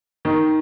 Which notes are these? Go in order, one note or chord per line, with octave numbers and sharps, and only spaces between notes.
D#3